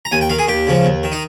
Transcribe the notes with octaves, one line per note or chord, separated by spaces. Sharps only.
A#5
D#2 G#5
G5
D#3 F5
G#4
D#2 G4
C#3 F3
D#2
D#3
D#4